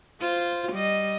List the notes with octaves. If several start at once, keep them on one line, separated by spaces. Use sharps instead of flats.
F4 C5
G3 D#5